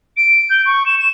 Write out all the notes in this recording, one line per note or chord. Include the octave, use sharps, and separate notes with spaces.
D7
G6
C#6
E7
E7